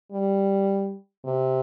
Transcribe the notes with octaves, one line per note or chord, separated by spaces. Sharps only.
G3
C3